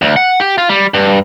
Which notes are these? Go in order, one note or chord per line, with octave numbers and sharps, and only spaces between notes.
D2
F#5
G4
F4
G3
G2